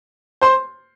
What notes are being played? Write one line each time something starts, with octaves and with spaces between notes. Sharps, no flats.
C5 C6